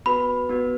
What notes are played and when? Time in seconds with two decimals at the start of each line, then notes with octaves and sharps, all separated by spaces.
0.06 B3 F#4 B4 B5
0.49 B3 F#4 B4